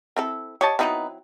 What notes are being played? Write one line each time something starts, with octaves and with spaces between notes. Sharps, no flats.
C4 E4 A4
G4 C#5 D#5 A5
F#3 B3 C4 D#4 E4 B4